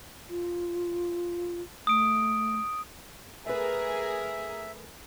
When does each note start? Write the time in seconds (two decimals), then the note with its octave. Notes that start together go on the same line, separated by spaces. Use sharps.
0.29 F4
1.87 A3 D#6 D7
3.46 A3 G#4 A#4 B4 E5